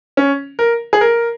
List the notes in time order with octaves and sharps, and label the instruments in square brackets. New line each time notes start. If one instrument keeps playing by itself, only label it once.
[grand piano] C#4
A#4
G#4
A#4